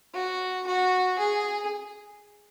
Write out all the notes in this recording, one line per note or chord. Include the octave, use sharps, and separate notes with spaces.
F#4
F#4
G#4